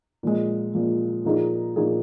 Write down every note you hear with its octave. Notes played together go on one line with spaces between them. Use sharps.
A#2 F3 G#3
A#2 F3 G#3
A#2 F3 A#3 D#4 G#4
A#2 F3 A#3 D#4 G#4